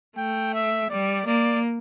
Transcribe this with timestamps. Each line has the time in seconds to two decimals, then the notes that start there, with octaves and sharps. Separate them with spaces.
0.17 A3 G5
0.54 E5
0.90 G3 D5
1.26 A#3 D5